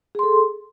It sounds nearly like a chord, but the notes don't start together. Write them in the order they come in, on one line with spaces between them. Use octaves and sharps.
G#4 C6 A4